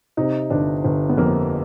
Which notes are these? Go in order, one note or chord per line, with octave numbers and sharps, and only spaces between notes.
C3 D#4
G1 D4
G1
B3
F2 A#3